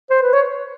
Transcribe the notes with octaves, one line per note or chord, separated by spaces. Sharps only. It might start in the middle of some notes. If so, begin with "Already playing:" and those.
C5
B4
C#5